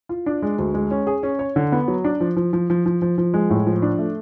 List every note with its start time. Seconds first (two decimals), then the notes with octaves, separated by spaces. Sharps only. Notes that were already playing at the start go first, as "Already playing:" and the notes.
0.09 F4
0.26 D4
0.42 G#3
0.58 D2
0.74 G#3
0.91 C#4
1.07 G#4
1.23 C#4
1.39 C#5
1.56 D3
1.72 B3
1.88 F#3
2.04 D4
2.20 F3
2.36 F3
2.53 F3
2.70 F3
2.86 F3
3.02 F3
3.18 F3
3.34 G#3
3.50 A2
3.66 F3
3.82 D4
3.99 A3